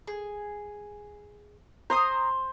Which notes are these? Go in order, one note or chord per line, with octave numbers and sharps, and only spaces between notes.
G#4
C5 A#5 C6 D#6